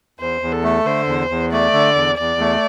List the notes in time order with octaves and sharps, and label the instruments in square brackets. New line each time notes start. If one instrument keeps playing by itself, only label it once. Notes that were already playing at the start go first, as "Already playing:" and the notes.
[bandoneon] E2 [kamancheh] C5
[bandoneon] E2
[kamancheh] A4
[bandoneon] A3
[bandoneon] D3 [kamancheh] C5
[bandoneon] E2
E2
[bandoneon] A3 [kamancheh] D5
[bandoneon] D3
E2
[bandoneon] E2 [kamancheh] D5
[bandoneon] A3